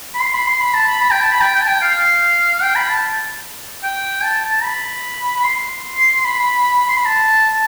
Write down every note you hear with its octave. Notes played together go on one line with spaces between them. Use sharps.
B5
C6
B5
C6
B5
A5
B5
B5
G5
A5
B5
G5
G5
A5
G5
F5
G5
B5
A5
G5
A5
A5
B5
B5
C6
B5
C6
B5
A5